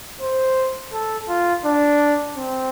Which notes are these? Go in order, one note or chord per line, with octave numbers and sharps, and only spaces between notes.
C5
A4
F4
D4
C4